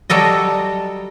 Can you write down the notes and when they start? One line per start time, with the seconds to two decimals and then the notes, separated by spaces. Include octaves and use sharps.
0.10 F#3 G3 A4 D#5